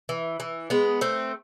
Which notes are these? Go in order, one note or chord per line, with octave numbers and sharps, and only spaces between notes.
E3
E3
G#3 B3
A3 C4